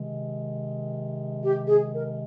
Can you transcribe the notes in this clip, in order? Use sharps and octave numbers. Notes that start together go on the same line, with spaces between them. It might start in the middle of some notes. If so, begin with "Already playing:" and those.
Already playing: C3 D#3 G#3
G4
G#4
A#4